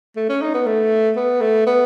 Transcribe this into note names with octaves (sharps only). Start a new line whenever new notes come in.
A3
C#4
D#4
B3
A3
B3
A3
B3